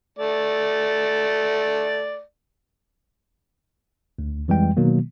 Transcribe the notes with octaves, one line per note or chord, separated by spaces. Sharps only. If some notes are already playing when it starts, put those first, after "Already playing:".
A3 D5
D2
F2 E3 G3 G#3 G5
B2 D#3 F#3 A#3